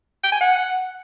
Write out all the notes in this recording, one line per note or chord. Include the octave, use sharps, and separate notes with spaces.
G5
G#5
F#5